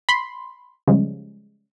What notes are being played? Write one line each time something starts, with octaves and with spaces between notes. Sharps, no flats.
B5 C6
C#3 F3 G3 G#3